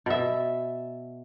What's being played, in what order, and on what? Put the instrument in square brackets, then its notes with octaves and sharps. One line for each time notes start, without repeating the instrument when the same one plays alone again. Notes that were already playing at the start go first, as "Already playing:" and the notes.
[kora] B2 E5